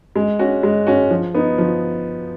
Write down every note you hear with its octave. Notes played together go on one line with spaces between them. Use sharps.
G#3
C#4 F#4
G#3
C#4 F#4
F3
B3 D#4
F3